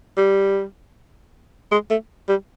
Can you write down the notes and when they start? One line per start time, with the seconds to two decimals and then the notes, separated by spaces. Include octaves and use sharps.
0.17 G3
1.72 G#3
1.90 A3
2.29 G3